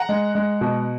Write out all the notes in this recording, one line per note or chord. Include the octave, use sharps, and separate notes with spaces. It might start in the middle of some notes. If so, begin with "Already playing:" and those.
Already playing: F#5 A#5
G#3
G#3
B2